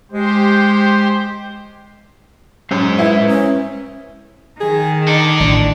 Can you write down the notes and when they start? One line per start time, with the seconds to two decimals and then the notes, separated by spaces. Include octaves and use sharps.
0.12 G#3 G4 C5
2.71 F#2 G#3 C5 A#5
2.99 E4 B4
3.28 C#4
4.61 D#3 G#4
5.07 D#4 A4 D5
5.40 A1 D4